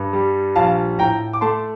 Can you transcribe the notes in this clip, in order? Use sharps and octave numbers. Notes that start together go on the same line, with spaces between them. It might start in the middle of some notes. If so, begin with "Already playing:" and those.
Already playing: G2
G3
A#1 F5 A5
A2 G5 A#5
D6
A3 A5 C6